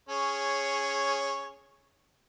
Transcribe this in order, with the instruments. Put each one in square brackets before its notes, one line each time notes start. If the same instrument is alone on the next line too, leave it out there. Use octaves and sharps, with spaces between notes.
[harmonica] C#4 G#4 C#5